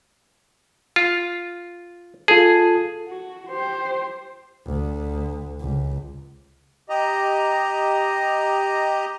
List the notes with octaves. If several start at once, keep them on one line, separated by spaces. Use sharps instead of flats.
F4
F4 G#4 A4 A5
F#4
G4 C5
D2
C#2
G4 D#5 A#5